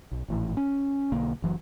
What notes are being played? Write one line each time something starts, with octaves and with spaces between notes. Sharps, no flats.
B1
G#1 A2 E3
C#4
B1 D3 A#3
F#1 E3 F#3